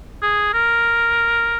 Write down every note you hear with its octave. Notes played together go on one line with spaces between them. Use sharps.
G#4
A#4